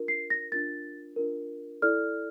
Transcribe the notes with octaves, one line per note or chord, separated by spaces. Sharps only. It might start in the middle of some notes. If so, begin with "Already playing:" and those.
Already playing: D4 F4 A#4
C7
A#6
D4 F4 A#4 A6
D4 F4 A#4
E4 A4 D5 F6